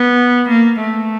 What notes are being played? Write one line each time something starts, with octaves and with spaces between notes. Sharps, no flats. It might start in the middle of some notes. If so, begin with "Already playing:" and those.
Already playing: B3
A#3
A3